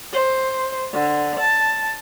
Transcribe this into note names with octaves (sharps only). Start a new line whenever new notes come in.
C5
D3
A5